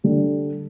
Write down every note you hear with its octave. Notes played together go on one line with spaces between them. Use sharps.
D3 G3 D4